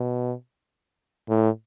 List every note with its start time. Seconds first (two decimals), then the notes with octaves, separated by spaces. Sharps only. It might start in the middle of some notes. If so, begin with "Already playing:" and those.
Already playing: B2
1.29 A2